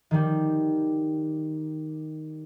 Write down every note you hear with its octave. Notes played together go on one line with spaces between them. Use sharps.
D#3 G3